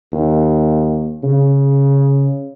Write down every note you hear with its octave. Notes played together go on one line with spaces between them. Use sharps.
D#2
C#3